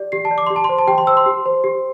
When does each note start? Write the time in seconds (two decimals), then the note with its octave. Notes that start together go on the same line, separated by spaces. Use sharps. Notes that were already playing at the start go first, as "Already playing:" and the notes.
Already playing: G4 D5
0.12 G4 C7
0.25 A5
0.31 D5
0.38 D6
0.47 G4 C6
0.56 A5
0.64 C6
0.69 C5
0.78 A5
0.88 G4 G5
0.98 C6
1.07 C5 E6
1.17 C6
1.26 G4
1.46 C5
1.64 G4